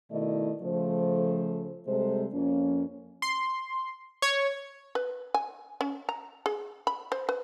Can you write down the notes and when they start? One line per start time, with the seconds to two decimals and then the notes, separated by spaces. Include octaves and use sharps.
0.11 B2 D#3 A3 E4 D5 D#5
0.62 C#3 F3 A3 A4 C5
1.87 C3 G3 G#3 A4 C5
2.34 F2 F3 A#3 C#4
3.22 C6
4.22 C#5
4.95 B4
5.34 G#5
5.81 C#4
6.09 A#5
6.46 G#4
6.87 B5
7.12 C5
7.29 B4